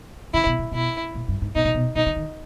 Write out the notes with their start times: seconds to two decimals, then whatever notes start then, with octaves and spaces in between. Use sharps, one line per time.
0.34 C#3 E4
0.46 B2
0.59 A#2
0.72 B2 E4
1.15 A#2
1.28 G2
1.42 G#2
1.55 B2 D#4
1.65 A#2
1.74 B2
1.95 B2 D#4
2.06 D#3
2.16 D#3